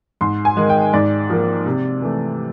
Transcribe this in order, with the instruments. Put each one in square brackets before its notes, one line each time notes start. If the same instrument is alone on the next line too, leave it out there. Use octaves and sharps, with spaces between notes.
[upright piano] G#2 C6
G#5
D#3 G#3
G5
G#2 D5
F3 A#3
C3
E3 A3